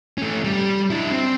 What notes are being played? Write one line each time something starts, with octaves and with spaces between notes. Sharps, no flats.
A3 C#4
G3
D4 E4
C4